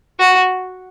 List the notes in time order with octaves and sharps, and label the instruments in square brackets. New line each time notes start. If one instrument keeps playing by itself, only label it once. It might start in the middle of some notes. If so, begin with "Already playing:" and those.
[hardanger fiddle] F#4